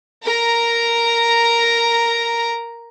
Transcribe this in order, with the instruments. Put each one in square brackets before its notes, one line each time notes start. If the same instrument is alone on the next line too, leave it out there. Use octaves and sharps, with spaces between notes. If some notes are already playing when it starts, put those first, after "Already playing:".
[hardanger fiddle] A#4 A#5